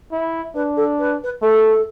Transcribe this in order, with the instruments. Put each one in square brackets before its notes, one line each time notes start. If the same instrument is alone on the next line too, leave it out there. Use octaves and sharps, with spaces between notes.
[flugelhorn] E4
[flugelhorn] D4 [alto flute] B4
[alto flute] A4
B4
B4
[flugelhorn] A3 [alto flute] A4